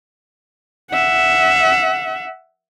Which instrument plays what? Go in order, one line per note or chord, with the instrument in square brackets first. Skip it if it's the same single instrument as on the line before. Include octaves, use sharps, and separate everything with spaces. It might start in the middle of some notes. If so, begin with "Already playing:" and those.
[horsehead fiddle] E5 F#5